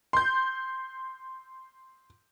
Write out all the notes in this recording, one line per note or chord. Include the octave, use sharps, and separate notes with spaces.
C6 G6